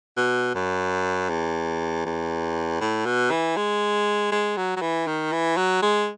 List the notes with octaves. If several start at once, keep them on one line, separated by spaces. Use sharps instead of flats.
B2
F#2
E2
E2
A2
B2
E3
G#3
G#3
F#3
F#3
E3
D#3
E3
F#3
G#3